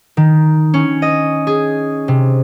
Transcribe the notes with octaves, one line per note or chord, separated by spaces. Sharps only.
D#3
C#4
D#5
G#4
C3